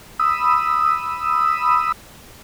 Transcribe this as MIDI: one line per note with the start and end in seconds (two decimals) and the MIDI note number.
0.20 1.92 83
0.20 1.92 87
0.20 1.92 88